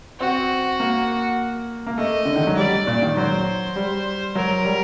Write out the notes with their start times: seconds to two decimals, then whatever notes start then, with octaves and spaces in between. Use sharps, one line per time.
0.20 C4 F#4
0.80 A#3
1.86 A#3
1.98 A3 D#5
2.25 D3
2.35 D#3
2.47 F#3
2.57 G3 D5
2.87 A#2
3.02 D#3
3.17 F#3 C5
3.76 G3
4.35 F#3 A#4
4.65 G3